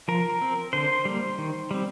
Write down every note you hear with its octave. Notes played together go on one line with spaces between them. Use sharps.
F3 A#4
C4
D3 C5
G3 A#3
D#3
G3 C4